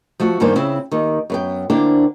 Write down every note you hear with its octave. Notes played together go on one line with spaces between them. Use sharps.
F3 A3 F#4
E2 G2 D#3 A#3 C5 G#5
C#3 C4 E4
D#2 D#3
F#2 B3 G5
D3 A#3 D4 E4 C5 G5